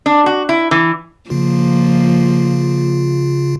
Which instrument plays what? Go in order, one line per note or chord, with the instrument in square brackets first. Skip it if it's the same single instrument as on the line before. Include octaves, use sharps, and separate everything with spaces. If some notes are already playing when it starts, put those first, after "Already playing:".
[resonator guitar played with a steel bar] D4
F#4
E4
E3
[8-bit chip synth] C#3 F4 [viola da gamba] F3 A#3